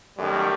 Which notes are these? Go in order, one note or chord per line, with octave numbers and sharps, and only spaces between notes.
F#2 D#3 G3 A3